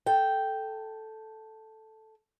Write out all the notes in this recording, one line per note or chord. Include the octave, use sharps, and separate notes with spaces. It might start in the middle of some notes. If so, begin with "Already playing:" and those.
A4 G5